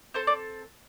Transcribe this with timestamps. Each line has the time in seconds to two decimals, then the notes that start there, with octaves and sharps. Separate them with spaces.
0.14 C4 A4 C5
0.27 D5